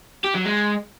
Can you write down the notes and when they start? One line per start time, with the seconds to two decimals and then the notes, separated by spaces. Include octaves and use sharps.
0.24 G4
0.34 F#3
0.45 G#3